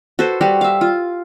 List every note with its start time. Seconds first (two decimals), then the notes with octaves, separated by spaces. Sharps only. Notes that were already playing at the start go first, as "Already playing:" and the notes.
0.19 F#4 A4 B4 C5
0.41 G3 F#4 G4
0.61 E5 F5
0.81 F4